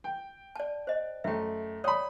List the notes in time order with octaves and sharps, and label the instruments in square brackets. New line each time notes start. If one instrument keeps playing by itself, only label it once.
[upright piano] G5
[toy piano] D5 A5
C5 D#5
[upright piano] F#2 A3 [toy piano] E5 G5
[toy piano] C#5 D5 G5 [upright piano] B5 D#6